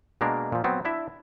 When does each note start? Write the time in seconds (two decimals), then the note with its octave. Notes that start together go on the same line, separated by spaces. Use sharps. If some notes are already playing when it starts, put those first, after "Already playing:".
0.21 B2 G#3 A#3 D4 A#4
0.52 A#2 F3
0.64 F#3 B3 C4
0.85 D4 E4 E5